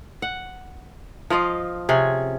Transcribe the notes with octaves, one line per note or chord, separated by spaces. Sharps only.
F#5
F3 F4 D#5 F5
C3 C#4 G#4